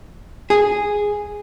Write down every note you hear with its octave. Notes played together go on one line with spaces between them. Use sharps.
G#4